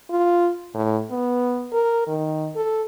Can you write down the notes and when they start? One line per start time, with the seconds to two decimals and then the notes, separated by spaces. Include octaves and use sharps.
0.10 F4
0.74 A2
1.10 B3
1.72 A#4
2.07 D#3
2.56 A4